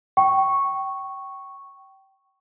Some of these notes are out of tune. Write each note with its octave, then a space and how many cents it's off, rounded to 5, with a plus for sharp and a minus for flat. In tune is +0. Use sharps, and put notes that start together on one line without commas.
G5 -25 C#6 -5